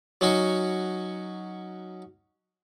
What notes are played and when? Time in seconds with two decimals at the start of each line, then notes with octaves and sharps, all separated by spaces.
0.21 F#3 C#4 D#4 F#4 C#5